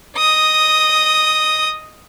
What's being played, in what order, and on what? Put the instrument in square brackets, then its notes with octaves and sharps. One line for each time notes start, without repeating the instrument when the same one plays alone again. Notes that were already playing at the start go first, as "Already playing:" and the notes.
[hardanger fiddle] D#5 D#6